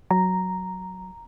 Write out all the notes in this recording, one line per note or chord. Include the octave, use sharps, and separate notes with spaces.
F#3 A#5